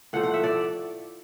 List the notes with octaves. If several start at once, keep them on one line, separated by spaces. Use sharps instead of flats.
A2 F3 A3 F#5
F#5
E5
D5